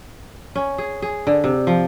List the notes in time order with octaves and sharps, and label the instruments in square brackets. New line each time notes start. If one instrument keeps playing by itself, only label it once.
[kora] C#4
G#4
G#4
D3
C3
F3